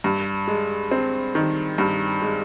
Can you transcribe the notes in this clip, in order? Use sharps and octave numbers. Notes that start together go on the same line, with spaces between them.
G2
G#3
C4
D#3
G2
G#3